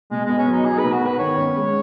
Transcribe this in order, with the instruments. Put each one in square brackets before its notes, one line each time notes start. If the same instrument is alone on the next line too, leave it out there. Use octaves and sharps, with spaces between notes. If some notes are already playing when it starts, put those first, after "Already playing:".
[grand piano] B2 [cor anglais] G#3
[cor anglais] G#3 [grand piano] B3
[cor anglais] C#4
[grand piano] F#3 [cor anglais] D#4
[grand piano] D#4 [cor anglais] G#4
[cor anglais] B4
[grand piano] B2
[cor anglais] F#4
[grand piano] B3 [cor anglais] B4
[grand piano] D#3 [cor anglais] C#5
[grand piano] C#4
G#3